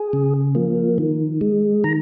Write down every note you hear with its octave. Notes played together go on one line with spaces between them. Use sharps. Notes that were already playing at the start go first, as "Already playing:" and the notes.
Already playing: G#4
C#3
F3 A#3
D#3
G#3
D#3 A#5